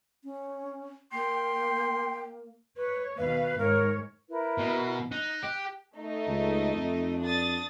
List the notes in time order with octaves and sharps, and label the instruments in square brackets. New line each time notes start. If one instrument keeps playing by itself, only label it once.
[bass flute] C#4
[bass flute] A#3 [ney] G5 [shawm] C6
[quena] B4 [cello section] C#5
[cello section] D#2 B2 F5 [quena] B4
[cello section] G#2 C#5 [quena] A#4
[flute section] E4 A#4 B4
[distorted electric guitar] B2
[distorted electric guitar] D#4 [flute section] F#6
[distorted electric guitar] G4
[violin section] A3 D#4 D#5
[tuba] C#2
F2
[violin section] D4 D#6 A6